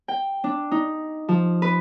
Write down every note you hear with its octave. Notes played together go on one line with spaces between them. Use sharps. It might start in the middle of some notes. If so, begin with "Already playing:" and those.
G5
D4
D#4
F3
B4